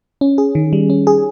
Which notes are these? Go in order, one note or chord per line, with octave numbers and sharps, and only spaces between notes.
C#4
G#4
D#3
G3
C#4
G#4